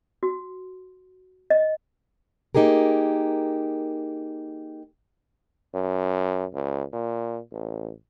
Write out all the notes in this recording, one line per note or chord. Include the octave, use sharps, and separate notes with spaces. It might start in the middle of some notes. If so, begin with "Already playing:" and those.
F#4
D#5
A#3 D#4 G4 G#4 A#4
F#2
C#2
A#2
A1